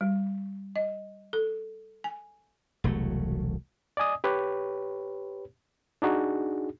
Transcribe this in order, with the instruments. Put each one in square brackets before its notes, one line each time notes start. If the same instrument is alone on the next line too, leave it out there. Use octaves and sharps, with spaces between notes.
[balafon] G3
D#5
A4
G#5
[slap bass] E1 C2 F#3 A3
[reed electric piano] D5 D#5 G#5 D#6
G4 B4 C#5
D4 D#4 F#4 G#4